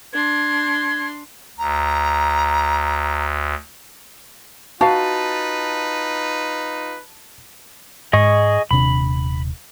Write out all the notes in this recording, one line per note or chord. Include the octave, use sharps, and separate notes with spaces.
D4 C6 G#6
D2 A#5
D#4 F4 F#4 B4 F5 A5
G#2 G#4 D#5 C#6
D#1 C3 D4 B5